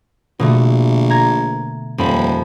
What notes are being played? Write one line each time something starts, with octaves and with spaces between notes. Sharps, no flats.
A#1 B2 D3 A3
A#5 G#6
D#1 F2 B5